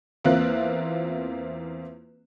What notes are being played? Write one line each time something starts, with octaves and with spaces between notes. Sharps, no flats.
E2 A#3 C4 F4 E5 F#6